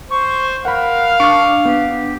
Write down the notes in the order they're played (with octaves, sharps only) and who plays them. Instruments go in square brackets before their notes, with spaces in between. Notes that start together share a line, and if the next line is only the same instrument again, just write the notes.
[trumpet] C5 [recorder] C#6
[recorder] A#4 [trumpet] F5 [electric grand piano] F#5 B5
[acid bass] D4 [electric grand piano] C#6 D6
[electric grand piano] B3 [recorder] G4